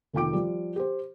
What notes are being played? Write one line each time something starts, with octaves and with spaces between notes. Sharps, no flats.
F1 D#3 F4 G5 D6 D7
F3 G3
G4 C5